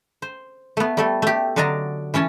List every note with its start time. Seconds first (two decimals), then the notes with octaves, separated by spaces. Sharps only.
0.22 C5
0.77 A3 B3
0.97 G3 A3 A4
1.22 A3 G4
1.56 D3 F#3 D4 D#5 A5 A#5
2.14 E3 C#4 C#5 A5